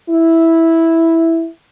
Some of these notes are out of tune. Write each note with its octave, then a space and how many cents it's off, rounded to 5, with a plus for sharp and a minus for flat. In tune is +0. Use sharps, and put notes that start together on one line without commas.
E4 -5